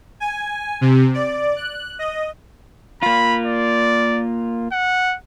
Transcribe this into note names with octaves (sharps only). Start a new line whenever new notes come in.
G#5
C3
D5
F#6
D#5
A#3 F4 B5
D5
F#5